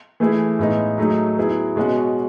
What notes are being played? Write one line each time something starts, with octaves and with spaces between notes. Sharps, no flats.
E3 A3 E4 G#4
A2 G#3 B3 D#4
F#3 A3 D#4 G#4
F#3 B3 E4 G#4
B2 G#3 C#4 F#4